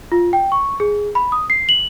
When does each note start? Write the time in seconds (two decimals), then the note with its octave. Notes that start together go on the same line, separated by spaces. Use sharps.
0.12 F4
0.33 G5
0.52 C#6
0.80 G#4
1.15 B5
1.32 D#6
1.50 C7
1.69 F#7